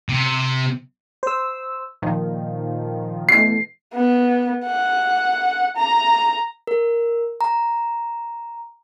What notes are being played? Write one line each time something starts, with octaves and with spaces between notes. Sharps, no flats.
C3
C5 E6
A#2 D#3 F3
B2 E3 A3 C7
B3
F#5
A#5
A#4
A#5